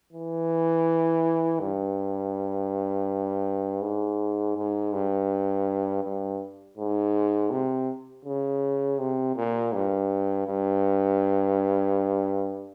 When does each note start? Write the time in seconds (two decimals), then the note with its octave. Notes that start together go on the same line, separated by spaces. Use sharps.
0.13 E3
1.60 G2
3.81 G#2
4.56 G#2
4.93 G2
6.04 G2
6.78 G#2
7.50 C3
8.25 C#3
8.99 C3
9.36 A#2
9.73 G2
10.47 G2